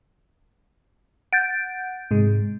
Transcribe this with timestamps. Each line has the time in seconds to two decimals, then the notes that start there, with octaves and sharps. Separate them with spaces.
1.33 F#5 G6 A6 D7
2.11 G#2 C3 G#3